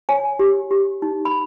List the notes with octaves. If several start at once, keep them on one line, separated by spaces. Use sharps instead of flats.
C#5 G#5
G4
G4
D#4
B5